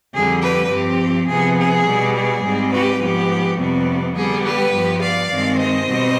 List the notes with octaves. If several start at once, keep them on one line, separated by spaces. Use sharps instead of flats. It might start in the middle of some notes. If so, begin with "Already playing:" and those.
F2 D3 G3 G#4
G4 B4
G2 F3 C4 G4
C3 F3 B3 G#4
G#4
B2 G3 B3
G#4
G#2 G3 C4
G4 B4
G#2 F3 B3 G4
F2 C3 G3 B3
D3 G3 B3 G#4
G4 B4
G2 F3 B3
D5 F5
G2 D#3 G#3 C4
C5 D#5
B2 G3 C4